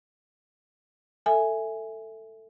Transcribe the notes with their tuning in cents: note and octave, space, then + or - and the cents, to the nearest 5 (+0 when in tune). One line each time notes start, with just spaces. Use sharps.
A4 +15 E5 +0 G#5 +0